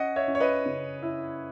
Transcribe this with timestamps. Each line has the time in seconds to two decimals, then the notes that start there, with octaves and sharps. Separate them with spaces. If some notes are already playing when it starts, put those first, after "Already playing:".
Already playing: C#4 D#5 F#5
0.16 C#5 E5
0.28 C#4
0.35 C#5
0.40 B4 D#5
0.66 C#3
1.03 E4